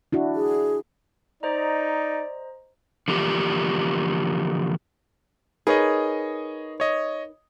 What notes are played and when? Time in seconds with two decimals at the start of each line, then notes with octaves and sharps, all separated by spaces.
0.12 D4 E4 F#4
0.35 G#4
1.43 D#4 C5 D5 D#5 A#5
3.08 D3 E3 F3 A#3 D4 G4
5.67 D#4 G#4 A#4 B4 C#5 D#5
6.80 C#5 D#5